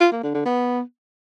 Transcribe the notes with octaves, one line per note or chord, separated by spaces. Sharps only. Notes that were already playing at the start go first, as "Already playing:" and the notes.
F4
A#3
D3
D3
B3